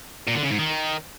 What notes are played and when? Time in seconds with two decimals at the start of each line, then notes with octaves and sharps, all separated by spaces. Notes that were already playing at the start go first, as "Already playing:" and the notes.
0.28 A#2
0.35 D3
0.43 C#3
0.51 G#2
0.59 D#3